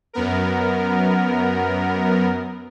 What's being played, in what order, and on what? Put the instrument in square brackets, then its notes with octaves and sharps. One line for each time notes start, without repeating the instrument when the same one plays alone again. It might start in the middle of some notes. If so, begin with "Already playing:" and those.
[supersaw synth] F#2 B3 A#4